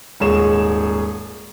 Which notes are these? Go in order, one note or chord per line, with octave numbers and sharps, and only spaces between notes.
D#1 G#2 G#4 C#5 E7